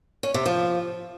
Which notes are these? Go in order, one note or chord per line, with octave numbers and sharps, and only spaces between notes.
C#4
C3
F3